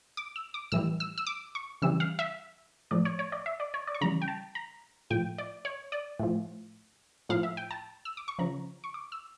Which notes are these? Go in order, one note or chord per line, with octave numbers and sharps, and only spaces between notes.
D6
E6
D6
A2 E3 G3 E6
E6
E6
D6
C#6
C#3 E3 G3 E6
F5
E5
A2 F3 D5
C#5
C#5
D5
E5
D5
C#5
D5
C#6
C#3 E3 G3 A#5
G5
A5
A#5
A2 F3 G5
D5
C#5
D5
A2 F3
A2 F3 F5
E5
G5
A5
E6
D6
C#6
C#3 F3 A#5
C#6
D6
E6